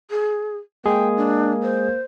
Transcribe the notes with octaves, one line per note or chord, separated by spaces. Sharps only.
G#4
G#3 A#3 G#4 G5
D4
C5